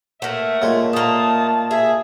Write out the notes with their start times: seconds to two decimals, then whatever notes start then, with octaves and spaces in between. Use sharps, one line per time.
0.22 A3 A#3 E5 F#5
0.62 A#2 G#3 C#5
0.93 A3 A#3 A5 D#6
1.71 G#4 E5